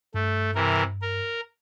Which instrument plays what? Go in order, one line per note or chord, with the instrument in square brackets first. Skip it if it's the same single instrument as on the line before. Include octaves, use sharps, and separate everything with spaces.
[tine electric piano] G2 [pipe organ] A3
[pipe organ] C3 E3 A#4
A#4